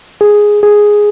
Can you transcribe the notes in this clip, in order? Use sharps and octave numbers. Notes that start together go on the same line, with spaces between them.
G#4
G#4